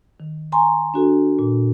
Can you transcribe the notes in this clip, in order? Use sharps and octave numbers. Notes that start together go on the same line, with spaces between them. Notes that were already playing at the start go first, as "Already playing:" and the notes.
D#3
G#5 A#5 C6 C#6
D4 F#4 A4
A#2